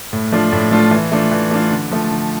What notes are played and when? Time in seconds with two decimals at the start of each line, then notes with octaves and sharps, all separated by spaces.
0.13 A2
0.32 F3 A3 D4 F4
0.53 A2
0.71 F3 A3 D4 F4
0.91 E3
1.12 A3 D4 F4
1.32 E3
1.51 A3 D4 F4
1.71 D3
1.91 F3 A3
2.11 D3